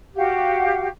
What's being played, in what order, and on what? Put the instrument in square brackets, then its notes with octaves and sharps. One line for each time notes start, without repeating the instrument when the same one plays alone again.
[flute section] F#4 G4 F5 F#5